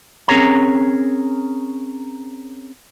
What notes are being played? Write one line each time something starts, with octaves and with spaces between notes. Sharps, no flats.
C4 C#4 G#4 A#4 C#5 A#5